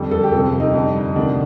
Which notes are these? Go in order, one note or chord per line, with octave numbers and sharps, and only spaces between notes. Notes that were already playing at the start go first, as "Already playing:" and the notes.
Already playing: F2 D3 G3 A4
A4
G4
F2 C3 F3 A4
D#4
F2 D3 G3
D2 C3 D#3 D4